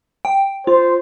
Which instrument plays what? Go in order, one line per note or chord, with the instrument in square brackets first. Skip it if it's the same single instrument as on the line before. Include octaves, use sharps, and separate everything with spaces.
[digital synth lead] G5
[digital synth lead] F4 [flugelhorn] C5